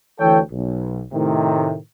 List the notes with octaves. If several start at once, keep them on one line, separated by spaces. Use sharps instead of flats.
D2 E3 A4 C#5 G5
B1
A2 C3 D#3